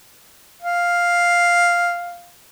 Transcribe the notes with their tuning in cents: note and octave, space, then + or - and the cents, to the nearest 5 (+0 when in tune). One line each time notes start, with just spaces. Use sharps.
F5 +0